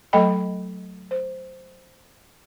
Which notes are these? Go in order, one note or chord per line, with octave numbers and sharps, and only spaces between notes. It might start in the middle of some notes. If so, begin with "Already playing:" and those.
F#3 A3 A4 D#5 G5 B5
C5